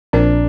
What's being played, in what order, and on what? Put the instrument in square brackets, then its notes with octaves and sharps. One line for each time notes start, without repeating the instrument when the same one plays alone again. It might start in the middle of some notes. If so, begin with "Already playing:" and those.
[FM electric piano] A#1 A#2 F3 C4 A#4 [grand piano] D4